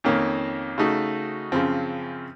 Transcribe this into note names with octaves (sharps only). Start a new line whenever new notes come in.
F2 D#3 A#3 C#4
C#3 A3 D#4 F#4
F#2 C#3 F3 C4